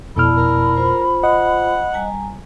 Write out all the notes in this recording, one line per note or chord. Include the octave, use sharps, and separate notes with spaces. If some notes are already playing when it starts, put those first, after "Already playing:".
F2 B2 E4 A4 D5 A5 B5 F6
A#4
F4 C5
D#5 F#5
G3 G#5 A#5